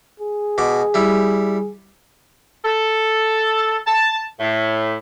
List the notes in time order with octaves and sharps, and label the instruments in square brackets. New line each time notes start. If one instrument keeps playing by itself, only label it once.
[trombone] G#4
[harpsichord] B2 D6
G3 E4
[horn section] A4
A5
A2